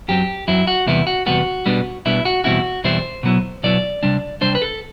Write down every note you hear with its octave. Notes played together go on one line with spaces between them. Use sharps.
F#2 F#3 C4 G4
F#2 F#3 C4 E4
F#4
E2 C3 G3 B3 E4
F#4
E2 C3 G3 B3 F#4
B2 G3 B3 D4
B2 G3 B3 D4 E4
F#4
E2 B2 G3 C4 E4 F#4
E2 B2 G3 C4 E4 C5
B2 F#3 B3 E4
B2 F#3 B3 E4 D5
C3 G3 D4
C3 G3 D4 C5
B4
A4